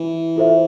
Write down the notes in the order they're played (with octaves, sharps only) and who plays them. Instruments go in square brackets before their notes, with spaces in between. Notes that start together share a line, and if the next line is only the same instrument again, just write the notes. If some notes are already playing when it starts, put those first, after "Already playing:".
Already playing: [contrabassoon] E3
[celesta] F4 A4 C5 E5